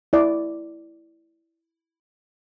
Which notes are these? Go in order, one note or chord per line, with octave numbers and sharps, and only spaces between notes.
E4 D5